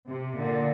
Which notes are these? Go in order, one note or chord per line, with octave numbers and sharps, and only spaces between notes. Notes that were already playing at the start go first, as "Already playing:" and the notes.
C3
A#2 D3